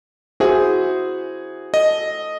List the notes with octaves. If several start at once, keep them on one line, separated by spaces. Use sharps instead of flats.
E4 F#4 G#4 C5 E5
A4 D#5